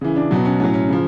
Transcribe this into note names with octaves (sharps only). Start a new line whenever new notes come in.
C#3 E3
D4
B2 F#3
C#4
A2 F#3 C#4
C#4
C#3 F3